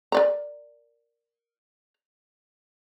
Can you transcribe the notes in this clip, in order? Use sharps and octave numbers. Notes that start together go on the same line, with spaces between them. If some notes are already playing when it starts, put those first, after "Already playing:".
A#4 D5 A#5